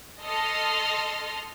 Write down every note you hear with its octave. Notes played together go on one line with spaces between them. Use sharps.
A4 D#5 C6 F6